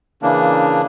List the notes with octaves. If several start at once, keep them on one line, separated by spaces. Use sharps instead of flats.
C#3 E3 A#3 D4